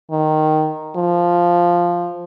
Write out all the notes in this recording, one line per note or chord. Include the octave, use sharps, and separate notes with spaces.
D#3
F3